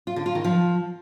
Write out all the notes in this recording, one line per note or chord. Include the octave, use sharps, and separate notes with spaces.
F4
D3
F4
D#3
F3